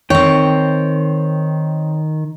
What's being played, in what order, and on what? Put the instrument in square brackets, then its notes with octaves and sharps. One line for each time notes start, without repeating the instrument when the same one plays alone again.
[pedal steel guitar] D#3 G5 [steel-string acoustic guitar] C4 C#5